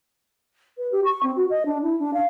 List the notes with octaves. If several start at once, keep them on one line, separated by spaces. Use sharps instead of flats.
B4
G4
C#6
C4
F#4
D#5
D4
E4
D4
F5